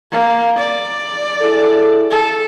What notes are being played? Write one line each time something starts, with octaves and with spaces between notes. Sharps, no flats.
A#3
D5
E4 G#4 A4
A4